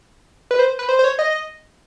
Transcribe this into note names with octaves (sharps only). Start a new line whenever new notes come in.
B4
C5
B4
C5
C5
C#5
D#5